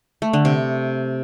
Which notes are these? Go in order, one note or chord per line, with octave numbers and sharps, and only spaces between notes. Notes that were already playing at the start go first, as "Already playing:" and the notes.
A3
D3
C3